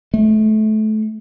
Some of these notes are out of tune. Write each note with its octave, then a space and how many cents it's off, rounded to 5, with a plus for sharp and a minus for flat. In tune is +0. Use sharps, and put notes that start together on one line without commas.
A3 -30